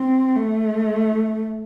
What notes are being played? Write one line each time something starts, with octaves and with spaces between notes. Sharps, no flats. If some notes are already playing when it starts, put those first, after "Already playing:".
Already playing: C4
A3